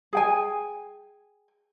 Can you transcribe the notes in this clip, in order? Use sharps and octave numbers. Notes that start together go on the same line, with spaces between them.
G#4 G5 G#5